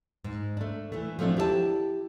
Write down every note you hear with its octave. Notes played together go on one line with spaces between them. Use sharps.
G#2
A3 D4
E3 A3
F3 F#3 A3 C4 D4
E4 G4 D5 A5